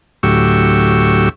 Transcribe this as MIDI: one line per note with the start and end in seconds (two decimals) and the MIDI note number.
0.23 1.29 38
0.23 1.29 45
0.23 1.29 54
0.23 1.29 67
0.23 1.29 85
0.23 1.29 88